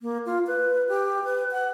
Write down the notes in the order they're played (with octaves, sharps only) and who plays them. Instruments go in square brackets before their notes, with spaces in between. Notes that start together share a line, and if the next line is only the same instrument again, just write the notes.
[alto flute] A#3
F4
B4
G4
B4
F#5